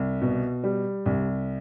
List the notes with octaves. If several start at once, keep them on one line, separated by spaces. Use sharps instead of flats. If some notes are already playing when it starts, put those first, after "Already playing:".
Already playing: C2
B2
G3
C2